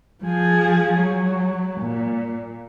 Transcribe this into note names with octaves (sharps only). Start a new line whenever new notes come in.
F3 G#4
F#3
A#2